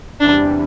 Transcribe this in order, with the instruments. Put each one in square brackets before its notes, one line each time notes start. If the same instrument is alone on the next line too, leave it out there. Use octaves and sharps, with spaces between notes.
[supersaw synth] E2 C3 E3 G3 [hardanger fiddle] D4